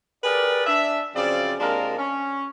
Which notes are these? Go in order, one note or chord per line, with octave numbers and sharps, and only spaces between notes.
G4 G#4 A#4 B4 D5
D4 E5
F#2 C#3 F3 C4 D5
C3 G#3 A#3 D4 F4 A#4
C#4